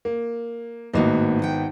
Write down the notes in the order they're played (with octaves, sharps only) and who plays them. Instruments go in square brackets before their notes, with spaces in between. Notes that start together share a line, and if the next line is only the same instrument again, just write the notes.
[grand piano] A#3
[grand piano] G#1 B3 D#5 [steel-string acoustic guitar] A2 A#3 F#4
[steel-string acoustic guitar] F#5 G5